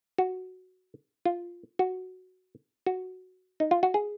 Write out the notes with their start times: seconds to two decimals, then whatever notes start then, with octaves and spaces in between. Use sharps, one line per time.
0.18 F#4
1.25 F4
1.79 F#4
2.86 F#4
3.60 D#4
3.71 F4
3.83 F#4
3.94 G#4